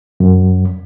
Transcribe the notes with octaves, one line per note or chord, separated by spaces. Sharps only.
F#2